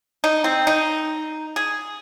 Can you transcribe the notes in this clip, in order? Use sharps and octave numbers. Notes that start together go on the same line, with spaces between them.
D#4
C4
D#4
G#4